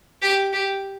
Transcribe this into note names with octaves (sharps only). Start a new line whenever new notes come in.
G4
G4